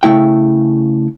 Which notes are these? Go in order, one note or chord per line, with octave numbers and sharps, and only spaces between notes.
C#3 A3 E4 G5